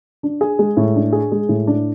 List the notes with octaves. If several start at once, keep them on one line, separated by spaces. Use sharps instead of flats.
D4
G#4
G#3
A2
D4
G#4
G#3
A2
D4